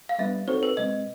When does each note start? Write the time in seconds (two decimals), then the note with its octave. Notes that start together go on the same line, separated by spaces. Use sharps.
0.09 F5
0.19 G3 B3 D4 E5
0.47 C4 D#4 F#4 A4 C5 C#5
0.63 B4
0.77 B2 G#3 C4 D#5